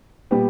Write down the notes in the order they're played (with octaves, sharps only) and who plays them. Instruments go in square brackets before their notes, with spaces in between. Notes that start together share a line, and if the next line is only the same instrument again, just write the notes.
[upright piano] A#2 G3 B3 G4